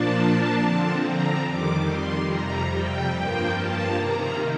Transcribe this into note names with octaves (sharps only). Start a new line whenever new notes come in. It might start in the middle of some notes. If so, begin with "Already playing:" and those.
Already playing: A#2 F3 A#3 D4 A5
D3 F3 C4
A#5
F2 D#3 G3 D6
C6
F2 C3 G3 A#5
G5
G2 F3 A#3 G5
A5
C3 D#3 A#3 A#5